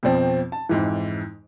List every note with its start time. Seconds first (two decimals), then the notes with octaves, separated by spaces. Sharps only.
0.03 F2 B2 F3 C4
0.52 A5
0.69 F2 G#2 E3